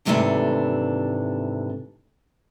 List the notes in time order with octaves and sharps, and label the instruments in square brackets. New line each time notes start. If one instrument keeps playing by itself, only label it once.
[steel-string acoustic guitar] D#2 G#2 C3 E3 A3 D4